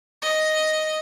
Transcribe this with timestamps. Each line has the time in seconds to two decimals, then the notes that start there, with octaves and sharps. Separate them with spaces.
0.22 D#5